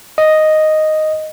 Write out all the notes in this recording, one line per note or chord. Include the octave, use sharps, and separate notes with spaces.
D#5